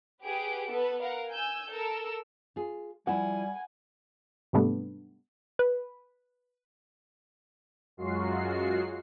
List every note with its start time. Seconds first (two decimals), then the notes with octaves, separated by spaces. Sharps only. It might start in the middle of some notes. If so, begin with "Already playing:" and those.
0.24 G4 G#4 B4 F#5 D7
0.69 B3 A4 B4
1.01 A#4 F5 F#5
1.30 G#5 E6 G6
1.71 A4 A#4 E6
2.56 F4 G#4
3.07 F3 G3 E4 F#5 G#5 B5
4.53 G#2 C3 G3 A3 B3 D4
5.59 B4
7.97 F#2 F#3 G#3 F4 F#4 C7